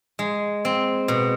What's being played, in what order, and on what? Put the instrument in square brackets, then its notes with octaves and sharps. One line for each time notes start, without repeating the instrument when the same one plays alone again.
[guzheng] G#3
C4
B2